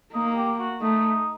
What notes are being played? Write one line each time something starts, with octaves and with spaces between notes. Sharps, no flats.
A#3 D#4
G4
F#4
A3 D#4